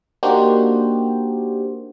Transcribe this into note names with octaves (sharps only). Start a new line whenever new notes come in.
A#3 D4 D#4 F#4 G4 C5